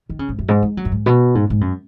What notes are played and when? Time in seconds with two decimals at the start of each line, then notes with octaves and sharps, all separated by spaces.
0.10 D#3
0.19 C#3
0.29 G#2
0.39 F#2
0.48 G#2
0.63 G#3
0.77 F#3
0.85 F#2
0.92 G#2
1.06 B2
1.35 G#2
1.50 G#2
1.61 F#2